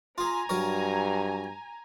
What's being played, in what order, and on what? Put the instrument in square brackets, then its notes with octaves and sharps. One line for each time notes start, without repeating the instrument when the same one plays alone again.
[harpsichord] F4 G#4 [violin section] G#5 A#5
[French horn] G2 [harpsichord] F#3 A#4 C#5